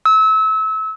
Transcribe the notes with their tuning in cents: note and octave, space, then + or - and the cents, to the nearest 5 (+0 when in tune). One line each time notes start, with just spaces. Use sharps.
E6 -30